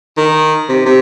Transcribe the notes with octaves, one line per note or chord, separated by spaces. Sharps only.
D#3
C3
C3